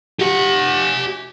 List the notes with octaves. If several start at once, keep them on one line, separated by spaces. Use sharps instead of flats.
G4 F#5